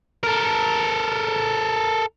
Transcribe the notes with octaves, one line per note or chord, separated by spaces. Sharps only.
A4 A#4